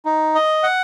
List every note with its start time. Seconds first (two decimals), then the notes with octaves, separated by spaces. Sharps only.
0.05 D#4
0.35 D#5
0.63 F#5